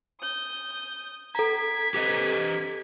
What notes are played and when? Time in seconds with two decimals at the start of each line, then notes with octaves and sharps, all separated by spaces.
0.21 D#6 G6
1.35 A4 A#5 G#6 B6
1.94 G4 B4 D#5